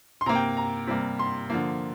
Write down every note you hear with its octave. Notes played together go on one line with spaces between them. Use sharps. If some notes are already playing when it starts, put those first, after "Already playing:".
C6
C3 A#3 A#5
G5
A#5
C3 G3 A#3
C6
D3 F3 A#3